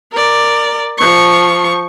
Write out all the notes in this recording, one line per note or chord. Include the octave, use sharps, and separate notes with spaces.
A#4 D5
F3 C#6